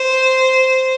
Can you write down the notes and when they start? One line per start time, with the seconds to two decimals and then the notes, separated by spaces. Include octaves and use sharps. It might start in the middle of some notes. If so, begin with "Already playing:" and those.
Already playing: C5